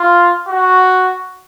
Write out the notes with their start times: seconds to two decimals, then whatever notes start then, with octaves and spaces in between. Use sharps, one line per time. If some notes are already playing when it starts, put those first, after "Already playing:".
Already playing: F4
0.48 F#4